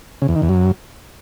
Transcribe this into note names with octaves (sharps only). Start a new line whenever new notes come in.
C#3
E2
D#3
E2
F#2